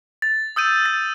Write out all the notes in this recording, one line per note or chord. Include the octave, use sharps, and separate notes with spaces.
A6
D#6 E6 G6 D#7
A6